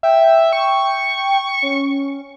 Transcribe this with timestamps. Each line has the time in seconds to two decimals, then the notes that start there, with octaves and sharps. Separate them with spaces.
0.03 E5 G5
0.53 C#6
1.62 C#4